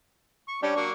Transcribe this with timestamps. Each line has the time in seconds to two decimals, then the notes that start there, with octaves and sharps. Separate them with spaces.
0.48 C#6
0.63 G3 C#4 D4 G4
0.76 F#3 A#3 C#6